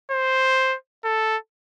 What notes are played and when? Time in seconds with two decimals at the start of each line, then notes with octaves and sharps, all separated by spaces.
0.11 C5
1.04 A4